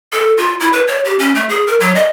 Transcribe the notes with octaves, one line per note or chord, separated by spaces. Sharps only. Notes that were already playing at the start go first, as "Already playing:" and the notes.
A4
F4
E4
B4
C#5
G4
C#4
A3
G#4
A#4
F#3
D#5